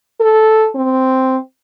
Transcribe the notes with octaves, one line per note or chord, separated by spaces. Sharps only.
A4
C4